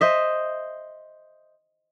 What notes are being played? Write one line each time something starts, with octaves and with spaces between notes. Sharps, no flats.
C5 D#5 E5